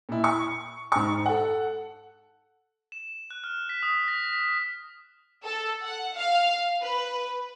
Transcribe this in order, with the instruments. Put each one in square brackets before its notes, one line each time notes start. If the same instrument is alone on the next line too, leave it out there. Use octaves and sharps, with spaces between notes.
[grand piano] A#2 E4
C#6
G#2 C#6
A4 F#5
[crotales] E7
F#6
F6
B6
D#6
A#6
B6
[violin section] A4
F#5
F5
B4